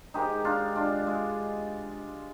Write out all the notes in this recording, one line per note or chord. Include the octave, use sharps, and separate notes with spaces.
G#2 D#3 G#3 D#4 G4
D4 F4
D4 F4
G#3